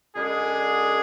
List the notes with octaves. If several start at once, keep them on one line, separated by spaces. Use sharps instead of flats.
F#2 D3 G#3 D4 G#4